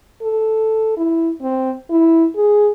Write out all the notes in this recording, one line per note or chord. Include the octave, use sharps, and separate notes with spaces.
A4
E4
C4
E4
G#4